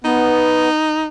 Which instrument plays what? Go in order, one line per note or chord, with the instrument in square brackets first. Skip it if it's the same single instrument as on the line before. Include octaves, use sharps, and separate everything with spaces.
[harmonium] B3 [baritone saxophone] D#4